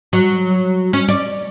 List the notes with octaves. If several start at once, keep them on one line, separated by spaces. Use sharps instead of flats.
F#3
C#4
D5